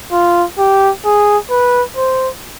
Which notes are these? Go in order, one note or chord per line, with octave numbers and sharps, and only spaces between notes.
F4
G4
G#4
B4
C5